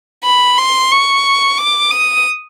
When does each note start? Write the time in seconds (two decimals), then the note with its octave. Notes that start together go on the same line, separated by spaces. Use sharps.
0.24 B5
0.58 C6
0.92 C#6
1.58 D6
1.91 D#6